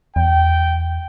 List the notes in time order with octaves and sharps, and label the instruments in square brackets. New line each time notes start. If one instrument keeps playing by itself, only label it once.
[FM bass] E2 [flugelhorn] G5